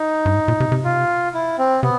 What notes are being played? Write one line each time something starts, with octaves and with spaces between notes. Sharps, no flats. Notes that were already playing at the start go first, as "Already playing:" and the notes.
Already playing: D#4
G2
G#2
A#2
C3
C3
F4
E4
C4
C3 B3